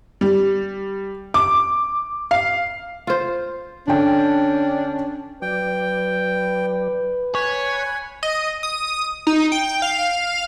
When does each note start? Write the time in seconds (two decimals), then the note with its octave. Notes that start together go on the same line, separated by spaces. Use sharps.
0.21 G3
1.34 D6
2.31 F5
3.07 F4 C5
3.88 D3 C#4 D4 G5
5.42 F#3 B4 D5 G5
7.35 C#5 G#5 B5 F#6
8.23 D#5
8.63 D#6
9.27 D#4
9.52 G5
9.82 F5